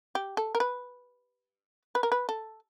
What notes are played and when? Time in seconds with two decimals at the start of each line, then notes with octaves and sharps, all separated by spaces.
0.15 G4
0.37 A4
0.55 A#4
0.60 B4
1.95 B4
2.03 A#4
2.12 B4
2.29 A4